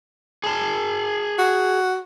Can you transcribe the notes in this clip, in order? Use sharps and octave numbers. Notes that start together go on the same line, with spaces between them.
G#4 A5
F#4